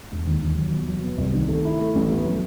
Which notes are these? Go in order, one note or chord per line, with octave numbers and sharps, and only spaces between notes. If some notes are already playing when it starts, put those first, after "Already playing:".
E1
D#2
D#2
F#3
B2
F#3
B3
C2
D#3
A3
E4
A3
A1
B3
F#3